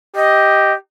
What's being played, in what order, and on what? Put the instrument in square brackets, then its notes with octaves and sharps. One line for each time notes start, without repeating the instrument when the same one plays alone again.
[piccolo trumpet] G4 [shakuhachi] D#5